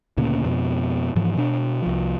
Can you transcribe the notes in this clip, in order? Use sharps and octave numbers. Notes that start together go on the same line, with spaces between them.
D2 A#2 C#3
F2 B2
G#2 E3 F3
B2 D4
C2 F3